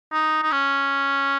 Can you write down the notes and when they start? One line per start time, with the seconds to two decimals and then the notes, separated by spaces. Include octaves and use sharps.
0.13 D#4
0.43 D#4
0.52 C#4